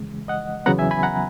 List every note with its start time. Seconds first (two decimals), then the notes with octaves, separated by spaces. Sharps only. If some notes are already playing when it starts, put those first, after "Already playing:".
Already playing: F#2 C#3 E3 G#3
0.28 D#5 F#5
0.66 E2 C#3 F#3 B3 F#5 A#5
0.79 E5 G#5
0.91 G#5 B5
1.03 F#5 A#5